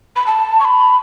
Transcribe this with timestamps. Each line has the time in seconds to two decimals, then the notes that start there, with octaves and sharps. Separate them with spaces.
0.16 B5
0.26 A5
0.60 C#6
0.65 B5